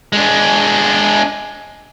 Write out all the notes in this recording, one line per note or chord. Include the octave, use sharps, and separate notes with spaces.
G#3 D4